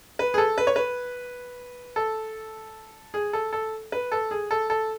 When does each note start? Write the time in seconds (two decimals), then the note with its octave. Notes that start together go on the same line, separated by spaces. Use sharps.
0.19 B4
0.34 G#4
0.38 A4
0.58 B4
0.67 C#5
0.76 B4
1.96 A4
3.14 G#4
3.33 A4
3.53 A4
3.92 B4
4.12 A4
4.31 G#4
4.51 A4
4.70 A4